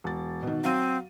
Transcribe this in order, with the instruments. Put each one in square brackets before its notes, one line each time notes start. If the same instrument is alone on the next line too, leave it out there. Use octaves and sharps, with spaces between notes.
[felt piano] E1 A6
B2 D#3
[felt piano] F#3 F5 D#7 [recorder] C4